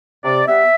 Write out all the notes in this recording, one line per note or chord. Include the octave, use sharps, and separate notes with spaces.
C3 D5
G3 B3 E5